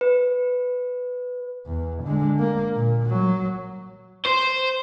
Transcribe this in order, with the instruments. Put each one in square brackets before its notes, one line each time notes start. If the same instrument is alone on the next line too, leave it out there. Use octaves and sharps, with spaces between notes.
[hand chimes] B4
[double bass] E2
D3 G#3
A#3
A#2
F#3
[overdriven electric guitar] C5